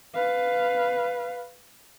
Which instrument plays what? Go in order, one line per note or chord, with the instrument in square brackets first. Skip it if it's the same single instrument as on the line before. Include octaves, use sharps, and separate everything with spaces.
[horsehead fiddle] B4 F5